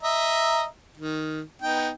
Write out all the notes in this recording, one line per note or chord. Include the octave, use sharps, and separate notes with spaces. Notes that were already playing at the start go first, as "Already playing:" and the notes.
D#5 E5 A#5
D#3
B3 D#4 G5